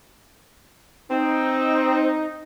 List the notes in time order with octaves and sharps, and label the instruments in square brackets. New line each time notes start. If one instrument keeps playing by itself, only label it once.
[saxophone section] C4 [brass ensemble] D#4